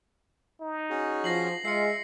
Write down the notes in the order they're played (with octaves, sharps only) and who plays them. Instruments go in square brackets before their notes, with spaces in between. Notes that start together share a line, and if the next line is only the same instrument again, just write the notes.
[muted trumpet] D#4
[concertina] C#4 F#4 G#4
[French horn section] F3 [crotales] A#6 C7 F#7
[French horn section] G#3 [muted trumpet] F4 [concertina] E5 [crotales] C7 C#7